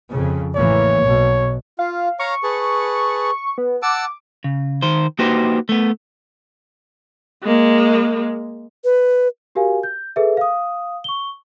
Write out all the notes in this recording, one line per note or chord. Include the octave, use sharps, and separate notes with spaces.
F2 C#3
A1 E3 A#3 C#5
B1 B2
F4 F5
C#5 F5 A#5 C#6
G#4 B4 A5
B3
F#5 A5 D6 E6
C#3
D#3 C5
A#3 D#4 F#4 G4 B4 C5
A3 B3
G#3 A#3
B4
F#4 G4 A#4 F5 G#5
G6
G#4 A4 B4 E5
F5 D#6
C#6 G7